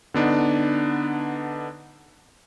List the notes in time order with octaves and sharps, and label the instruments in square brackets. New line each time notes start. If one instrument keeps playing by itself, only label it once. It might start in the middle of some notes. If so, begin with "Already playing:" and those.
[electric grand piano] D3 B3 D4 D#4